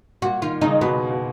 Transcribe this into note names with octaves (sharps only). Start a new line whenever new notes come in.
A#2 F#4
D#3 F4
C#3 D#4
B2 B3
B2